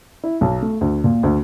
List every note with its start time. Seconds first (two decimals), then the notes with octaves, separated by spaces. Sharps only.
0.24 E4
0.41 B1
0.63 A3
0.81 D2
1.04 A#2
1.23 D2